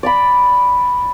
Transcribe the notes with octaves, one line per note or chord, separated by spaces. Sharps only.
D5 A#5 B5